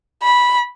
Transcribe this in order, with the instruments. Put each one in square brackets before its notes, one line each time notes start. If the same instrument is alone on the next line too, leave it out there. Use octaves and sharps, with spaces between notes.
[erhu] B5